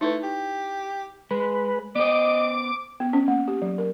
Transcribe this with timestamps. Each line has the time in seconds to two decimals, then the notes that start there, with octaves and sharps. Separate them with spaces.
0.01 A3 D#4 E4 B4
0.23 G4
1.31 G#3 B4
1.96 B3 C5 D#5 D6
3.00 B3
3.13 C#4
3.28 A#3
3.48 G4
3.62 F#3
3.78 A#4